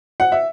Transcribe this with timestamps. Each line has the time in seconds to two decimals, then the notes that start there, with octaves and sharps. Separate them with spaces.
0.20 F#5
0.32 E5